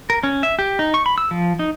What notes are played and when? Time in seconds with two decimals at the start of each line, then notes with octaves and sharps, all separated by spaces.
0.10 A#4
0.23 C#4
0.43 E5
0.59 G4
0.79 D#4
0.94 C#6
1.06 B5
1.18 E6
1.31 F3
1.59 D#4